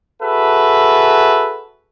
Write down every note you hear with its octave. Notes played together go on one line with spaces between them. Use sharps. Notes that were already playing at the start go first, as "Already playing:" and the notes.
F#4 G#4 A4 B4 E5